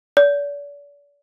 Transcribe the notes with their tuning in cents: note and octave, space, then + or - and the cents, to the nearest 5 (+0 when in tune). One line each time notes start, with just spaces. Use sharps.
D5 -40